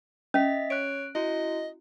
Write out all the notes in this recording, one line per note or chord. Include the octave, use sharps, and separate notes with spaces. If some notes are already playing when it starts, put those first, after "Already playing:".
C#4 D#5 E5 B6
C#5 F#6 D7
E4 F#4 D#5